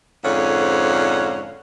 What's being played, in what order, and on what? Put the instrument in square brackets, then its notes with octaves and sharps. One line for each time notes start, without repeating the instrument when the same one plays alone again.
[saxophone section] F2 G#2 D3 C#4 F5 F#5